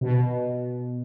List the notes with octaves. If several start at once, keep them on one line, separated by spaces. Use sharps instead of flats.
B2